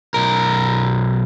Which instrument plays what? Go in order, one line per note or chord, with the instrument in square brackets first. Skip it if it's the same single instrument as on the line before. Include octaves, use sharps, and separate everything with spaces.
[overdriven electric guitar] B1 A#4